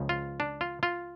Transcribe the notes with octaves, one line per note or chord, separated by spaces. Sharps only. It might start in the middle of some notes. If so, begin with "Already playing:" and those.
Already playing: C#2 C#3 F3
F4
D4
F4
F4